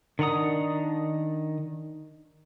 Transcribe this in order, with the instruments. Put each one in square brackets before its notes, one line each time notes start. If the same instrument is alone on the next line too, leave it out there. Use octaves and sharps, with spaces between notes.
[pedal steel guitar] D#3 D4 F#5 A#5 D#6